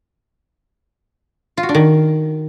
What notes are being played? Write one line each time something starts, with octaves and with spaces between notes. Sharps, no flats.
F4
F#4
D4
D#3